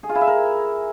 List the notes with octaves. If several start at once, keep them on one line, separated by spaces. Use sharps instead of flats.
G#4
F4
E4
E5
A#4